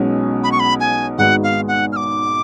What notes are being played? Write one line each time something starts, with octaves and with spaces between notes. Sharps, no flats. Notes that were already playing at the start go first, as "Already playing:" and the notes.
Already playing: B1 B2 G#3 C#4
B5
C#6
B5
G#5
G#1 G#2 G#3 B3 F#4 F#5
F5
F#5
F6
D6